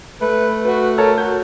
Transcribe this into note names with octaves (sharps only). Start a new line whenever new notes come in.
A3 B4
F#4 B4
A4 A#4 C#5 A5
F#4 G6